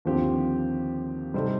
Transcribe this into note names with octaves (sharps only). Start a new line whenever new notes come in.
D#2 D3 F3 C4 G4
C3 G3 C4 D#4 A4